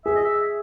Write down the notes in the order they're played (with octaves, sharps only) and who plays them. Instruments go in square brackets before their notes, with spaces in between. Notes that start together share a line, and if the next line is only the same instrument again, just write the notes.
[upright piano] G#4 [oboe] E5
[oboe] D#5
E5